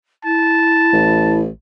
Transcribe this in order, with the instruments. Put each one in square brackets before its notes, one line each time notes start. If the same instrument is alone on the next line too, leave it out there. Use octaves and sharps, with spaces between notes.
[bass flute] E4 [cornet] A5
[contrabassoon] A1